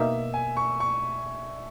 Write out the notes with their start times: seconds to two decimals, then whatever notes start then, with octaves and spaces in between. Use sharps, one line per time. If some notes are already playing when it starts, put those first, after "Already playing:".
Already playing: B2 A#3 D#4 E5
0.34 G#5
0.57 C#6
0.80 C#6